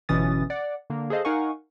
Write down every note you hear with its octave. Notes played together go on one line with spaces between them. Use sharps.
G1 B2 E3 C#4 D#6 A6
D5 F#5
D3 A#3
G#4 A4 C5 D#5 F5
D#4 A#4 F5 F#5 G#5 C#6